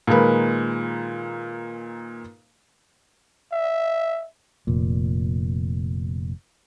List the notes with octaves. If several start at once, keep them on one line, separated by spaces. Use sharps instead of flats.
A#2 D#3 G#3 A#3 B4
E5
F1 A#2